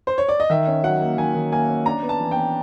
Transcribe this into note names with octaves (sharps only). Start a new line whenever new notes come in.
C5
C#5
D5
D#5
D#3 E5
C#4
F#3 F#5
A#3
D#3 G#5
D#3
A#3 G#5
C#4
D4 A#5
B3
A5
E3
G5
B3